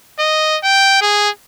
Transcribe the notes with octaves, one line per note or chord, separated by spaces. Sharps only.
D#5
G5
G#4